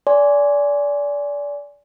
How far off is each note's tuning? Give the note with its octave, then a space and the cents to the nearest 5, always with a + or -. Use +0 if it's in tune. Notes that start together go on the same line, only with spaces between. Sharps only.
D5 -25 G#5 +0 C6 +25